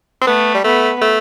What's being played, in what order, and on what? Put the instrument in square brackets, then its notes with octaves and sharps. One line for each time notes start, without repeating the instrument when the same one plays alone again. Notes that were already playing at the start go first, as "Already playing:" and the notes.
[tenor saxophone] C4
[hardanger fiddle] A3 [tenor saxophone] B3
[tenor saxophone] G3
[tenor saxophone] A3 [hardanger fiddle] B3
[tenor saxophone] A3